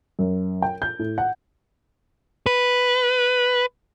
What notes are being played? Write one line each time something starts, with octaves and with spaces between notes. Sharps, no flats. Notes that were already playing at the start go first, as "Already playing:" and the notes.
F#2
G5
G6
A2
F#5
B4